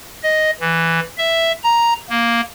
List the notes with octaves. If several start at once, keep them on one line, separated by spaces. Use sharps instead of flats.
D#5
E3
E5
A#5
A#3